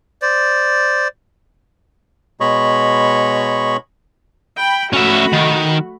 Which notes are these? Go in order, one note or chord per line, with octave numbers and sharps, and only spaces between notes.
C5 D5
B2 G#3 C#5 D#5 B5 C#6
G5 B5
A3 C#4 F#4 E5 B5
D#3